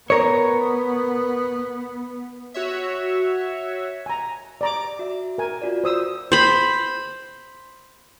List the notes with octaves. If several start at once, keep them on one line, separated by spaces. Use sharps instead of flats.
B3 A#4 C#5
F#4 C#5 E5
G#5 A#5
D5 A#5 D6
F#4 E5
A#4 G#5
F4 F#4 D5
C5 D#6 E6
C5 B5